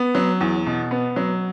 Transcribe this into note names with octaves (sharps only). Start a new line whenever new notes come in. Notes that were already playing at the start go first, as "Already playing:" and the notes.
Already playing: B3
F#3
E2
B2
B3
F#3